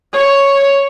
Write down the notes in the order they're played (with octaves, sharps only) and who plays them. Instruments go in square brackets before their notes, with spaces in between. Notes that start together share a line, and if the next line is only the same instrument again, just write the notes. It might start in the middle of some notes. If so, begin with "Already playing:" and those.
[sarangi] C#5